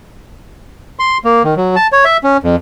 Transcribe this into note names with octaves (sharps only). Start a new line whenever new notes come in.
C6
A#3
D#3
F#3
A5
C#5
E5
C#4
F2